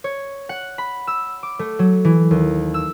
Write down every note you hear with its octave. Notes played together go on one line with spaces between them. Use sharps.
C#5
F#5
B5
E6
D6
A3
F#3
E3
D#2
E6